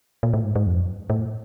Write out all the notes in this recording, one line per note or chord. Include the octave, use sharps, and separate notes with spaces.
A#2
A2
G#2
G#2
F2
F#2
A2